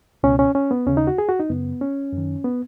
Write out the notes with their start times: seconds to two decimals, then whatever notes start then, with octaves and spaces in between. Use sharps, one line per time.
0.23 C#2 B2 C#4
0.39 C#4
0.55 C#4
0.71 B3
0.87 D#2 C#3 C#4
0.97 D#4
1.07 F#4
1.18 G#4
1.29 F#4
1.40 D#4
1.50 F#2 C#3 B3
1.81 C#4
2.13 F#2 D#3
2.44 B3